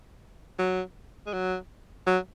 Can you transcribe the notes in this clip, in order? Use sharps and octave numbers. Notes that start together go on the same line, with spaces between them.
F#3
G#3
F#3
F#3